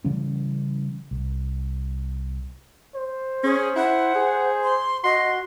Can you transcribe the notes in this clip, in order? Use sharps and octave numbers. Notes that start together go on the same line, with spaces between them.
C#3 E3 G3 C#4
C2
C5
C#4 G#4
E4 F#5
G#4
C6
F#4 D#5 C6